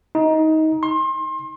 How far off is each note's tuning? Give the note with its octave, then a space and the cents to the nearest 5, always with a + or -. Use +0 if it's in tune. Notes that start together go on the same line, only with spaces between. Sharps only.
D#4 +20
C6 +30